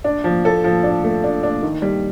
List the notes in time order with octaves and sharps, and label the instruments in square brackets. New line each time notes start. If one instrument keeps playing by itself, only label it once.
[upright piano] D4
F3
A4
F3
D4
A3
D4
D4
D#3
G3